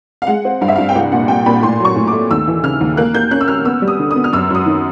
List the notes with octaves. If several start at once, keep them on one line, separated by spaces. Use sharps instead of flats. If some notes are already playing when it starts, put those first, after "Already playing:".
F5
G#3 F#5
C4
G2 F5
E5
G2 F5
G5
C2 F#5
A#2 F#5
A#2 G5
A#2 B5
A2 C6
F#3 C#6
A2
D6
A3
D#2 E6
E3
C#3 F6
D#2
A#3 F#6
A#3 G6
C#4 F#6
E6
C#4 F6
B3 E6
G3
D#6
D3
D#6
B3
F6
F#2 E6
F#2 D#6
D#3